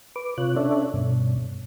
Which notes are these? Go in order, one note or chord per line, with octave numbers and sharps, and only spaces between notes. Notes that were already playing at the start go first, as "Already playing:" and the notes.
B4 D6
C3 F4 C#5 F#6
C#4 D4 A4 C#5 D5 E5
G2 B2